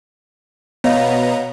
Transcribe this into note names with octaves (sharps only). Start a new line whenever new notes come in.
B2 B3 C#5 D#5 F5 A#5